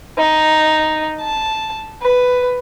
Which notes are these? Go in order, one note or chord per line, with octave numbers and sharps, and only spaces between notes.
D#4
A5
B4